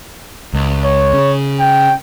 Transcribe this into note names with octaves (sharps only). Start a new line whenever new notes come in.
C#2
C#5
C#3
G5